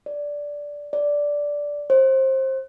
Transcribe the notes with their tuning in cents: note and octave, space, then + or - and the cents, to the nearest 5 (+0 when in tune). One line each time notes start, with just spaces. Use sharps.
D5 -10
D5 -10
C5 +25